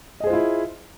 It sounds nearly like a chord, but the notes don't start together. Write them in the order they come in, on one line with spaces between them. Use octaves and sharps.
D#5 G#4 C5 F4 E4